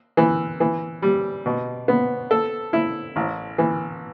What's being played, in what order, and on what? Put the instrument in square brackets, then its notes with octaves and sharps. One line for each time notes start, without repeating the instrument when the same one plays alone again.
[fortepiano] E3
E3
G3
B2
B3
A4
E4
A1
E3